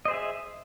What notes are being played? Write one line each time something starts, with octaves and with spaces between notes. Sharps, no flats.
G#4 C5 D#5 E5